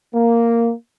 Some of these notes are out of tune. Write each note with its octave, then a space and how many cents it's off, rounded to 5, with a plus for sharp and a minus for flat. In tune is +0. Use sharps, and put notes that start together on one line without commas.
A#3 -5